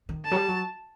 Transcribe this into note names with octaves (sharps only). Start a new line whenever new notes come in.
D#3
D3 A5
F#3
G3
F#3